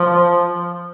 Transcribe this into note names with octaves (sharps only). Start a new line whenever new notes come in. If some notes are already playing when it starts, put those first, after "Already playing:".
Already playing: F3